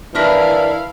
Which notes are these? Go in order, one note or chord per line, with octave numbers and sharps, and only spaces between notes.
E3 D4 E4 A#4 B4 F5